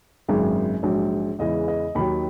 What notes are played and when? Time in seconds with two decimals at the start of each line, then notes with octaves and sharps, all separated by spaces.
0.28 G#1 F#2 C#3 G#3
0.83 A#1 G#2 F#3
1.39 E2 C#3 E3 G#3 D#5
1.68 D#5
1.95 D#2 D#3 F#3 B5